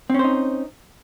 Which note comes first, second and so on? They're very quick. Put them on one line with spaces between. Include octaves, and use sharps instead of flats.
C4 C#4 C5 D#4